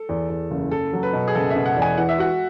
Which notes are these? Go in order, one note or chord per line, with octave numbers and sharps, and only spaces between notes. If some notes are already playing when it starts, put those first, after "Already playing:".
Already playing: A4
E2
E2
F#1
F#1 A4
F#3
B4
B2
G#4
F#1 A4
E5
B2
F#5
E2
G#5
E3 F#5
E5
F#4 F#5